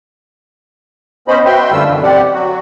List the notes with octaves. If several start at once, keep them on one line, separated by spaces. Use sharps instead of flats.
B3 C#4 C5 D#5 B5
F#4 B4 E5 G5 C6
F#2 D3 G3 A3 F4 E6
F#2 B2 D3 E3
C4 G4 D5 F#5
F#3 F#4